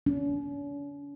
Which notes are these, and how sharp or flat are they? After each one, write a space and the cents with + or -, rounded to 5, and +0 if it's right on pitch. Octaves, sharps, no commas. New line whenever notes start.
C#4 +45